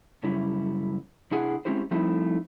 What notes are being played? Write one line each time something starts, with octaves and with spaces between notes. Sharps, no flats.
F#2 C#3 G3 C#4 E4
C3 D4 E4 G#4 F#5 G#5
G#3 C4 C#4 E4 G4 C5
F3 G3 A3 C4 D#4 E4